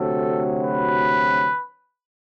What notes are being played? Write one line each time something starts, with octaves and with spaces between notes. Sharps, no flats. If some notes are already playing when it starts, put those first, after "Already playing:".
Already playing: D2 C3 F#3 A4
B4